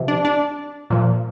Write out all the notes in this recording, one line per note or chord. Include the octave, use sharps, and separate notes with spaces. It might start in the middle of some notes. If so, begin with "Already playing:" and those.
Already playing: C3 F3
D4
D4
A#2 F3